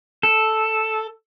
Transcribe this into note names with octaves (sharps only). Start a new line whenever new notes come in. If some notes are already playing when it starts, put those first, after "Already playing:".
A4